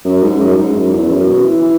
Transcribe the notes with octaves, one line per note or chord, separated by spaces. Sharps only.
F#2
G#2
F#2
G#2
F#2
E2
F#2
B2
E3
E3